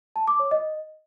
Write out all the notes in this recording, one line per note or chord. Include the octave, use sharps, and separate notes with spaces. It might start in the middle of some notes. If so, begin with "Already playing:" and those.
A5
D6
C#5
D#5